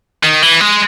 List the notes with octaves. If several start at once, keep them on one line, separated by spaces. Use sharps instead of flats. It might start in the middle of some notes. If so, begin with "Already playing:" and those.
D#3
E3
G#3